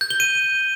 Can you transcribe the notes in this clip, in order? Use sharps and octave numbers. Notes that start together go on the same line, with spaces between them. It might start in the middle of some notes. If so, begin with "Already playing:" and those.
G6
G7
D#7